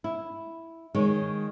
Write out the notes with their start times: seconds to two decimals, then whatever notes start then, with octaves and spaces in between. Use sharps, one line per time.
0.04 E4
0.95 D#3 G#3 C#5